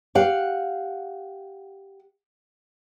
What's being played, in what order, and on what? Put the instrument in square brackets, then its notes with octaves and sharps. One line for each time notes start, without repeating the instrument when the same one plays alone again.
[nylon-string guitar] G4 F5 F#5